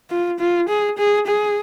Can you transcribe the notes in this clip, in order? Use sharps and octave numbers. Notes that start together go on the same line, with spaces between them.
F4
F4
G#4
G#4
G#4